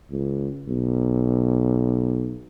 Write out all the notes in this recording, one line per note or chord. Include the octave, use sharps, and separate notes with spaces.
C#2
B1